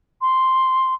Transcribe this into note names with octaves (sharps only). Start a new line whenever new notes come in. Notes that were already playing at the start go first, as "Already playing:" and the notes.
C6